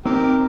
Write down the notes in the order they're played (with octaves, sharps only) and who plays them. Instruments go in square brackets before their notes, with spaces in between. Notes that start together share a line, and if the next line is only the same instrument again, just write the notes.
[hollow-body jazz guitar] C4 D#4 [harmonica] G4 A#4